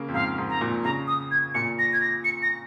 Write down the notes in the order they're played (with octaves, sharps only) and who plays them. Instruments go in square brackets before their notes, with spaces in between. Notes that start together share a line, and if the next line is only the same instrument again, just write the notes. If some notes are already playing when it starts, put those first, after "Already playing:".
Already playing: [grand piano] C#3 A#3
F2
[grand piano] G#2 [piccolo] F5
[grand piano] G#2
[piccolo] A#5
[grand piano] A#2
[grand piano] C#3 [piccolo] A#5
[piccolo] D#6
G#6
[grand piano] A#2 [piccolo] C#7
[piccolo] A#6
G#6
A#6
C#7
A#6